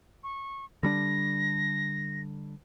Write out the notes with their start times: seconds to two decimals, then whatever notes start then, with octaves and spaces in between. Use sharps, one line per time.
0.24 C#6
0.83 D3 G3 D4 A#6